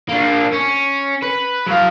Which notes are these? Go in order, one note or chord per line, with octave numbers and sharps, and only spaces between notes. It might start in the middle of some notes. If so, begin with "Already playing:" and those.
A#3 D4
C#4
B4
F#3 F5